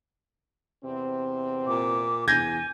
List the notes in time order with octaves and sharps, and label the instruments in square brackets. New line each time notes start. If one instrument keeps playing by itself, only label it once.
[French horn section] E2 C3 C4
[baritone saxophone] A#2 [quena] D6
[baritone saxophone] E2 [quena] G#5 [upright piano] G6 G#6 A#6